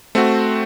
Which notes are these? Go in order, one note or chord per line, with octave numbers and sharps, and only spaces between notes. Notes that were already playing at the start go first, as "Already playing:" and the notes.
A3 C4 F#4